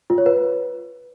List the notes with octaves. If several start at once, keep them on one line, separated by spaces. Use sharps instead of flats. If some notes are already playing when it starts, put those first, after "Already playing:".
F4
C#5
B4